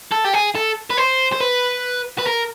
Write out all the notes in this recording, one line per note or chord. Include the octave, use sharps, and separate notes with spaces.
A4
G4
G#4
A4
B4
C5
C5
B4
B4
A#4